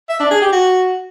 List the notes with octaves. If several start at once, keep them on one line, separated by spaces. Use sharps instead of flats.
E5
D4
G#4
G4
F#4